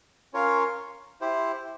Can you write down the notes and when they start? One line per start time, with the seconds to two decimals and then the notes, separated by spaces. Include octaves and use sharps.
0.33 C#4 F4 A#4 C#5 F5
1.21 E4 G4 C5